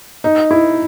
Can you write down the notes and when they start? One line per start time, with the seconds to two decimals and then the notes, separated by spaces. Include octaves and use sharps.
0.24 D#4
0.51 E4